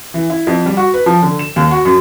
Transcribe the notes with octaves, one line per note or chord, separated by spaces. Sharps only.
E3
E4
F2
G3
F#4
B4
F3
D3
E7
D#2
F#4
F#2